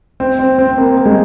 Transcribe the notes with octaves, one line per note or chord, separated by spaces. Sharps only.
C4
C4
C4
C4
A#3
A#3
G#3